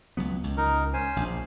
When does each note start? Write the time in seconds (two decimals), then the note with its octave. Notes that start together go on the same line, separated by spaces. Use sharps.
0.17 C#2 F#3 B3
0.44 C#2
0.57 D#4 A#4
0.93 C#4 C5 G#5
1.16 A#1